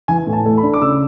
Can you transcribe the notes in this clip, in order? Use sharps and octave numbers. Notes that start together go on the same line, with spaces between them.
E3 G#5
A2
A5
A3
B5
D4
D6
C#3 E6